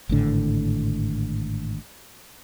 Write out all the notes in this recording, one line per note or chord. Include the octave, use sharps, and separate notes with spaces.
G#1 A2 D3